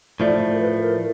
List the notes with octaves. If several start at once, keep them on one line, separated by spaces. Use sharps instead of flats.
A2 F3 A3 D5
A#4
B4
A#4